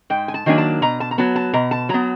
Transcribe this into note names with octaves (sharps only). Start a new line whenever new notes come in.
G#2 G5
G#5
A5
D#3 F#3 A#3 D4 G#5
A5
B2 A#5
A5
A#5
F#3 B3 A5
A5
B2 A#5
A5
F#3 B3 A#5